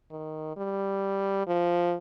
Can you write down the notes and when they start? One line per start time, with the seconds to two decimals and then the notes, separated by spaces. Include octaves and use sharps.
0.11 D#3
0.57 G3
1.47 F3